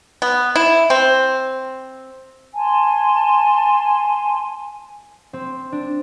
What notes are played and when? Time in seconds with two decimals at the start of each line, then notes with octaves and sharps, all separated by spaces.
0.22 B3
0.55 E4
0.90 C4
2.54 G#5 A5 C6
5.33 C4
5.72 D4